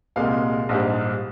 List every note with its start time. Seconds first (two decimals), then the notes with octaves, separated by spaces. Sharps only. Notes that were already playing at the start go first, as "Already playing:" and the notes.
0.16 C2 A#2 G#3 F5
0.69 A#1 G#2 G3